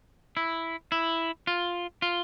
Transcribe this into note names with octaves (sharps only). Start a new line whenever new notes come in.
E4
E4
F4
F4